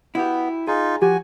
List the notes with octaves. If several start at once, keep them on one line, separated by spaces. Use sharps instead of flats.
B3 E4 F#4 G4
D#4 F4 G#4
F3 F#4 G4 G#5